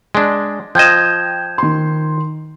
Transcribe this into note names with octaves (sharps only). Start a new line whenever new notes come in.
G#3 D4
F3 D#5 G5 G6 G#6 E7
D#3 C6